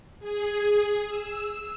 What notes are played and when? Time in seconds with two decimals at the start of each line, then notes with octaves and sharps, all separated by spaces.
0.19 G#4
1.08 E6